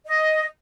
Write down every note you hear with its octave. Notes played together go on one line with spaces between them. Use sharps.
D#5